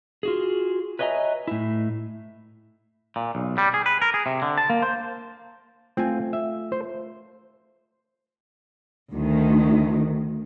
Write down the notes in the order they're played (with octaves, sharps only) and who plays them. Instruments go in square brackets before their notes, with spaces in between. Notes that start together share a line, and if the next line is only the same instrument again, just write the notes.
[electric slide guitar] F4 F#4 G#4
B4 C#5 D#5 E5 G#5 A#5
A2 E4
[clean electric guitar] A#2
B1
G3
G#4
B4
A#4
G#4
C3
D3
A5
A#3
C5
[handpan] A3 F4 [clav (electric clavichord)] C4 G#5
[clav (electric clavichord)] E5
C5
[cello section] D2 D#3